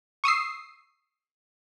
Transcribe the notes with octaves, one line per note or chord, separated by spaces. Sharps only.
C#6 D#6 E6 C7